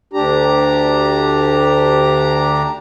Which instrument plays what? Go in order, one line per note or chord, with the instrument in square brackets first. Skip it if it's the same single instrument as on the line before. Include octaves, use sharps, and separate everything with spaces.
[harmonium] D2 D4 G4 A#5